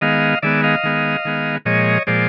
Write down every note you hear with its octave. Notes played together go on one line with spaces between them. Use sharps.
D#3 G#3 B3 D#5 F5
D#3 G#3 B3 D5 E5
D#5 F5
D#3 G#3 B3
D#3 G#3 B3
A#2 F3 G#3 C#5 D#5
A#2 F3 G#3 C5 D5